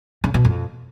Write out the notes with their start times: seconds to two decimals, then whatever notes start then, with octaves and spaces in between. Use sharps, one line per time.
0.24 C#3
0.34 B2
0.45 F2